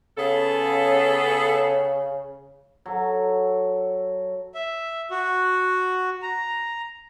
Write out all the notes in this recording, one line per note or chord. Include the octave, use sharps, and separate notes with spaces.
C#3 B3 G#4 A4
F#3 A4
E5
F#4
A#5